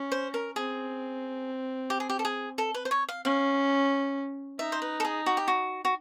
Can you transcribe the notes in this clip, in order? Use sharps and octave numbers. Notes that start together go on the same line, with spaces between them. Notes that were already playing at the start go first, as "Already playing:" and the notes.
Already playing: C#4
C5
A#4
C4 G#4
G4
G#4
G4
A4
G#4
A4
B4
C5
C#5
F5
C#4 F5
D#4 E5
C5
B4
A4
G#4
F#4
G4
F#4
F#4